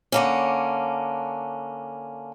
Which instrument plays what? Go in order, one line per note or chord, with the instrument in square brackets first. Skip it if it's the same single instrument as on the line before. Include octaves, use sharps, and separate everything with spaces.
[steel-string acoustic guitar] D3 A#3 C#4